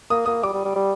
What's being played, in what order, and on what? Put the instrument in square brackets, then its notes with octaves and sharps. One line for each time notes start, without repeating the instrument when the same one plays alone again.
[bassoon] A#3 [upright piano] D#6
[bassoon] A#3 [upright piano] D#6
[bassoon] G3 [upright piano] D6
[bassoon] G3
G3
G3